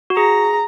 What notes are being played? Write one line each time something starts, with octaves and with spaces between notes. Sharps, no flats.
F#4
G#4 A#5